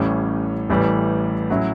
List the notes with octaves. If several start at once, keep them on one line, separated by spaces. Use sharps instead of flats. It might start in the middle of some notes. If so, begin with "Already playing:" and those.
Already playing: A1 A2 G3 C#4
A1 A2 E3 G3
A2 F#3 C#4 E4